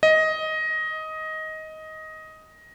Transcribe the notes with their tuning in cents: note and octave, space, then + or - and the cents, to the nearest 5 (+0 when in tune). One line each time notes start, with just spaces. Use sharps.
D#5 +15